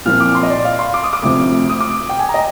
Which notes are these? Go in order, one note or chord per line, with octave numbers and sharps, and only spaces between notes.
A#2 F3 C4 F6
D6
C6
D#5
D5
F5
C6
D6
D#6
D6
D2 C3 F3 C4
D#6
D6
G5
G#5
A#5
D#5